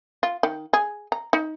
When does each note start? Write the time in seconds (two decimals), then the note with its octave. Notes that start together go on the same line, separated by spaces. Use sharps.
0.23 F4
0.43 D#3
0.73 G#4
1.12 A#5
1.33 D#4